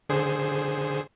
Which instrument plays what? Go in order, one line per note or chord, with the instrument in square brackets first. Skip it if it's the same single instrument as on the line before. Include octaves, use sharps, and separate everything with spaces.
[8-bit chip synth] D3 G#4 C5